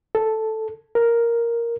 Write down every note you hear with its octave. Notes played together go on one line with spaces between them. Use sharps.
A4
A#4